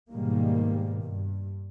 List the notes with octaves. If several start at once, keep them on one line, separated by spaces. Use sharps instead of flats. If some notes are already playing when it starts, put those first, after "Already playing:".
G#2 B2 D#3 G3 A#3
G2